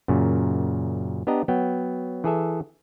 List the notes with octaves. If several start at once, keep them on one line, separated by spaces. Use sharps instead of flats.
F#2 A#2 C#3
B3 D4 G4 D#5 A#5
F#3 B3 G5
E3 G#4 A4 E5